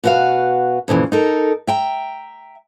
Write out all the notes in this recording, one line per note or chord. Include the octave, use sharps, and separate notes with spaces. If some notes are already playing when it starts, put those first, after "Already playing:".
B2 E4 F#4 B4 F5
F2 A#2 C#3 E3
D#4 A4 A#4
E5 G5 A#5